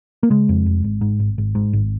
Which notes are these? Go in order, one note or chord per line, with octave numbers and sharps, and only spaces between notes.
A#3
C#3 G#3
F2
F1
G#1
G#2
G#1
G#1
G#2
G#1